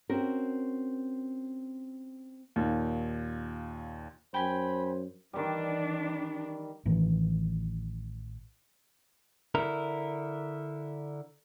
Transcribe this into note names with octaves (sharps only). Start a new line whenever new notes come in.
C4 C#4 F#4 A#4
D#2 A#2
F#2 C5 G5 G#5 B5
D#3 E3 G3 D4
A1 A2 D#3 E3
D3 E4 A#4